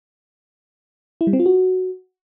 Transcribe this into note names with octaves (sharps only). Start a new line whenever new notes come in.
E4
G3
C4
F4
F#4